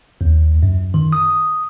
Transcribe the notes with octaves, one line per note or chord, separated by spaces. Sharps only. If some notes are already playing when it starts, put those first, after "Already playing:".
D#2
F#2
D#3
D#6